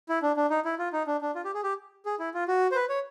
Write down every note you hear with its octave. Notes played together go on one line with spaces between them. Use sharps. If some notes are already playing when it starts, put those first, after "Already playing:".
E4
D4
D4
D#4
E4
F4
D#4
D4
D4
F4
G4
G#4
G4
G#4
E4
F4
F#4
C5
B4
C#5